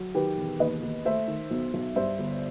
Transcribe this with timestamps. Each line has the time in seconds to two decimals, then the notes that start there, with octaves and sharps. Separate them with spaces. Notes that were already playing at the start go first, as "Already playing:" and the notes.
Already playing: F#3
0.15 D#3 G4 B4
0.37 E1
0.59 D#2 B4 D#5
0.83 D#2
1.05 A3 C5 E5
1.28 D#3
1.51 B1
1.74 B1
1.96 G2 C5 E5
2.19 G1